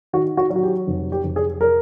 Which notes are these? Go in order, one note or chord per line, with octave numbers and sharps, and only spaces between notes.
D#3 F#4
F#4
F#3
F#4
G4
F1
G4
F1
G#4
A#4